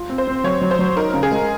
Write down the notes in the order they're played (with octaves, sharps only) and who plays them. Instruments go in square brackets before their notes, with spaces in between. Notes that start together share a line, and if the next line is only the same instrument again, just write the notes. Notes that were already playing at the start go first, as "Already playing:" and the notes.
Already playing: [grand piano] F4
C4
[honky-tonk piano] C5
[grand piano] C4
[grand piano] F#3 [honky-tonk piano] C#5
[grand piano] F#3
[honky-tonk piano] C5
[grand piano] F#3
[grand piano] D#4 [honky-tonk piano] A#4
[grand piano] C#3
[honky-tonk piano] G#4
[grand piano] G#3